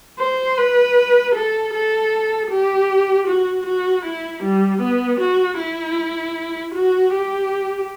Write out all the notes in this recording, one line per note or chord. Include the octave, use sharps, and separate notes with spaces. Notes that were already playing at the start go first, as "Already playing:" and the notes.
C5
B4
A4
A4
G4
F#4
F#4
E4
G3
B3
F#4
E4
F#4
G4